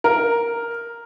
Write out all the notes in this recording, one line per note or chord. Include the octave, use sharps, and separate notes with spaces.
A#4